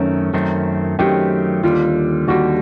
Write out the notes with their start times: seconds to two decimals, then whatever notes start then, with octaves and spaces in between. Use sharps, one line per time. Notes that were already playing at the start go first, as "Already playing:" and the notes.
Already playing: F#2 D#3 F#3 A3 C4 C#4
0.33 F#2 D#3 F#3 A3 C4
0.99 F#2 D#3 F#3 A3 C4 G4
1.63 D#2 D3 G3 F4
2.28 D#2 D3 G3 F#4